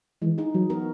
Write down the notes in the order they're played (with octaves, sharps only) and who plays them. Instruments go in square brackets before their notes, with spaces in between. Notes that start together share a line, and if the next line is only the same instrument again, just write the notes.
[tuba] E3 [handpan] G#3
[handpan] D#4 G#4
[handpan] E3 [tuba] F#3
[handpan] B3 F#4 A#4